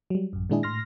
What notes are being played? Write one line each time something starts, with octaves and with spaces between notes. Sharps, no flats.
F#3 G3
A1 F#2
A#2 D#3 G#3 D4 E4 G#4
A2 C6 F6 A#6